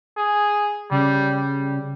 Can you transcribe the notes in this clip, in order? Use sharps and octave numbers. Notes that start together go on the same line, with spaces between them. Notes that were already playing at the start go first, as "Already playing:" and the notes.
G#4
C#3 G3
G3